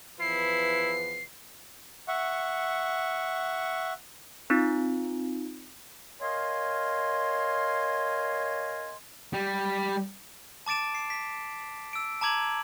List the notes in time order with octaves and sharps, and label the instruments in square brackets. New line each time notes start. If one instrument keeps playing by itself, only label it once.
[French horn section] E2 F3 B4 [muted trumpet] E4 [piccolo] C7
[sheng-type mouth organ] E5 F#5 C#6
[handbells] C4 D#4 F4
[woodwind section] A#4 C#5 D#5 F5 G#5 C6
[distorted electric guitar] G3
[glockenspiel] A5 D6 A6 D7 E7
C7
B6
E6 D7
A5 A#5 D6 G#6 F#7